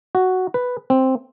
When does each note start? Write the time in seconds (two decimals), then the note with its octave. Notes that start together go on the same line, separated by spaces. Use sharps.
0.15 F#4
0.54 B4
0.90 C4